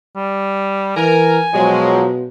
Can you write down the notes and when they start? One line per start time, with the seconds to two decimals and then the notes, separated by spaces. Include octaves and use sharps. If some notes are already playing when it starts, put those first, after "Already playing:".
0.16 G3
0.97 E3 A#4 G#5
1.54 B2 F3 F#3 G#3